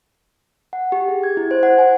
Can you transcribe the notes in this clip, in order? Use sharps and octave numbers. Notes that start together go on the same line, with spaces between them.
F#5
G4
G#4
G#6
E4
C5
F#5
G#5